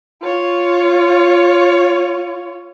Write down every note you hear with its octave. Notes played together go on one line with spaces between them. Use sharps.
F4 C#5